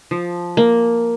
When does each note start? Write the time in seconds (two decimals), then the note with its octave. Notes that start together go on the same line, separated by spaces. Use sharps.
0.11 F3
0.57 A#3